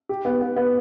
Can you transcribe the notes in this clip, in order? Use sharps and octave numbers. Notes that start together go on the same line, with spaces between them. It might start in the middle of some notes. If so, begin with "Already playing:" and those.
G4
B3
B3
B3